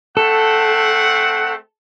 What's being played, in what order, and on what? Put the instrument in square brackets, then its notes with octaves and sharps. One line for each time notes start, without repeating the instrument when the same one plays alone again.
[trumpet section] A3 C4 F#5 [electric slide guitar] A4